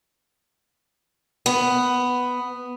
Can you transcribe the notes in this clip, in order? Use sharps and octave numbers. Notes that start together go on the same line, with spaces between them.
B3